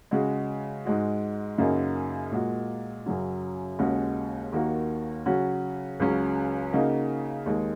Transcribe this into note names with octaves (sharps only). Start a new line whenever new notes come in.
C#3 G#3 F#4
G#2 G#3 F#4
F#2 C#3 A#3 D#4 F#4
A#2 G#3 F#4
F#2 C#3 F#3 C#4 F#4
D#2 C#3 G#3 C#4 F#4
D#2 D#3 A#3 F#4
C#3 F#3 C#4 F#4
C#2 C#3 F#3 C#4
C#3 A#3 D#4 F#4
D#2 D#3 G#3